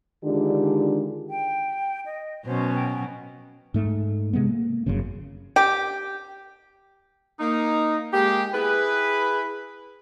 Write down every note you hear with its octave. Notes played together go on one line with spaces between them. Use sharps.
D3 D#3 G#3 D4 F4 G4
G5
D#5
B2 F#3 C#4 C5
G5
G#2 A3
C3 G#3 A3 B3
A#3
G1 F#2 C#3
G4
A#3 D#4
G#3 A#3 G4
E4 G#4 B4